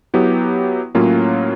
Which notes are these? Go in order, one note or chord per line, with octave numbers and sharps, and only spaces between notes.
F#3 B3 E4 G4
A2 F#3 A#3 C#4 F4